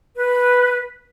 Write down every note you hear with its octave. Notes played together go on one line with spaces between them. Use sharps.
B4